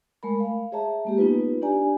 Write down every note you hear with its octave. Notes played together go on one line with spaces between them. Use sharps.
G#3 A3 A#4 B5
F5
G#4 C#5 E5 A5 A#5
G#3 A#3 G4
B3 D#4 F4 B4
D4 G4 D5 G#5 A#5